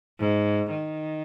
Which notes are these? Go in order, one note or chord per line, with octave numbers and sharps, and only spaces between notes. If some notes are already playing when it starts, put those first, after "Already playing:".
G#2
D#3